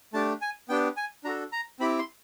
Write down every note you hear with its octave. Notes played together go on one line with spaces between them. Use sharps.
A3 D4 G4 A5
G#5
B3 D4 G4 G5
G#5
D4 F#4 A4 A#5
A#5
C4 E4 G4 B5
C6